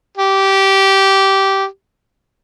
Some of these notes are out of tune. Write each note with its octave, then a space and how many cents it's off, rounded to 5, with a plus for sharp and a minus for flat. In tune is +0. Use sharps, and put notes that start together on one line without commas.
G4 -15